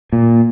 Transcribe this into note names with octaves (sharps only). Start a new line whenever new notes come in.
A#2